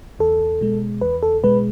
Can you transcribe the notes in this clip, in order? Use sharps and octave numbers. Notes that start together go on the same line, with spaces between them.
E2 A4
B2 G#3
E2 B4
A4
B2 G#3 B4